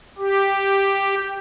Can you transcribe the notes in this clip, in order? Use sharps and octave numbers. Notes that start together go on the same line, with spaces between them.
G4